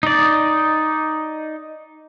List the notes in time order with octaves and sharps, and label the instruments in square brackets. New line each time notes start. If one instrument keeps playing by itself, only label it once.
[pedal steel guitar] D#4 D5